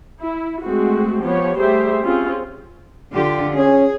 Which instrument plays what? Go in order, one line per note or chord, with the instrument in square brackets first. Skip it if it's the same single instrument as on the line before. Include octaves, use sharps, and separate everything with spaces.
[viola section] E4
G#3 A3 C4 F#4
F3 B3 G4 C#5
G3 A3 G4 G#4 C5 E5
C4 C#4 F4 G#4
[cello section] D3 F4 G4
[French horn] C#4 [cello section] G#4